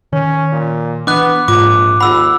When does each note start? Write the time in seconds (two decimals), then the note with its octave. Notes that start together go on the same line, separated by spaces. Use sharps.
0.13 D#3 C#4 C#5
0.52 A#2
1.07 E3 B3 D4 D#5 D6 F#6
1.48 A#1 G#2 F4 D6
2.00 D#2 F4 G#4 F#5 B5 E6